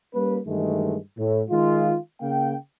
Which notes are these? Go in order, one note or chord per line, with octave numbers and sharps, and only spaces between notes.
G3 A#3 C#4 B4
G2 D#3 E3 G#3 A3
A2
D#3 G#3 F4
C#3 A#3 F5 G5